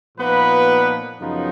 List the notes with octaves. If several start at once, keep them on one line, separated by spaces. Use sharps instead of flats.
A#2 F3 A#3 B3 D#4 B4
F#2 C#3 F3 B3 D#4